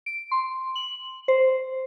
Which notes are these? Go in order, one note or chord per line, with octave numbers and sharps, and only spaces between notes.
D7
C6
F#7
C5